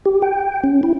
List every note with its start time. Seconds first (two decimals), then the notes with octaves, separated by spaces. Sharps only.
0.06 G4
0.22 G5
0.64 C#4
0.83 E4